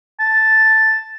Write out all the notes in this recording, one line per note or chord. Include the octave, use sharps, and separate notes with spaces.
A5